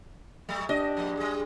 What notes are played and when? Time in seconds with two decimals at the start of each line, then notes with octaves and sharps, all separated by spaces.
0.49 F#3 G3 A3
0.69 D4 G4 D#5
0.97 G#2 F3 A#3
1.17 G3 G#4